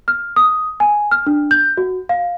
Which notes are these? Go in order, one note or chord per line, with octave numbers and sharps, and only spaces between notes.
F6
D#6
G#5
F6
D4
G6
F#4
F5